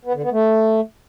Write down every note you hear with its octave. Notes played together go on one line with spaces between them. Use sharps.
B3
D3
B3
A3